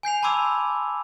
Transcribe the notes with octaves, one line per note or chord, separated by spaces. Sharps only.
G#5 G6 C7 F7
A5 B5 C6 D6 E6 G#6